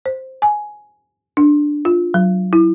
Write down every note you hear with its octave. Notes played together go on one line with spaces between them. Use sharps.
C5
G#5
D4
F4
F#3
E4